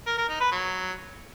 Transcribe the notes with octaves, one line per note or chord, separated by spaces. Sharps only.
A#4
A#4
D#4
B4
F#3